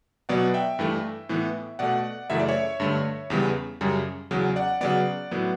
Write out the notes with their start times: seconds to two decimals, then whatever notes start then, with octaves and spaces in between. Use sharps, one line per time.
0.29 B2 F#3 B3 D5 F#5
0.54 E5 G5
0.79 G2 E3 A3
1.29 A2 E3 B3
1.79 B2 A3 D5 F#5
2.30 F#2 C#3 E3 A3 E5
2.40 D5
2.48 C#5 E5
2.80 G2 D3 A3
3.30 E2 C#3 G3 B3
3.81 F#2 C#3 G3
4.31 E2 C#3 F#3
4.56 D5 F#5
4.81 C#3 F#3 B3 D5 F#5
5.31 A2 F#3 B3